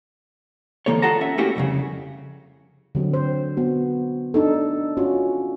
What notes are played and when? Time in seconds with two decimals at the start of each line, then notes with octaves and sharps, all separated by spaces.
0.86 D2 E3 A#3 A4 C#5
1.02 F4 G#4 A4 F#5 A5 A#5
1.21 C#4 E5
1.38 A3 A#3 C#4 E4 F#4 G4
1.55 C2 F2 A#2 C#3
2.95 D3 F#3 C4
3.14 C5
3.57 B3 F#4
4.34 D4 D#4 A4
4.97 C#4 F4 F#4